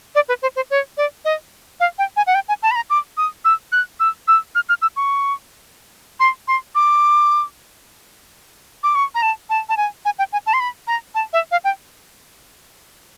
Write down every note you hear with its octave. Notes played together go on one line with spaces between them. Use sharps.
D5
B4
C5
C5
C#5
D5
D#5
F5
G5
G#5
F#5
G5
G#5
A5
B5
A#5
D6
D#6
E6
F#6
E6
E6
F6
F6
E6
C#6
C6
C6
D6
D6
C#6
A#5
A5
A5
A5
G#5
G#5
G5
G#5
A5
C6
B5
A#5
A5
E5
F5
G5